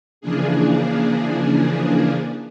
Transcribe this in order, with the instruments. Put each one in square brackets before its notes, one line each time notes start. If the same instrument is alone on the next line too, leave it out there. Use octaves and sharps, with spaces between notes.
[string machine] C#3 E3 F3 A#3 D4 G#4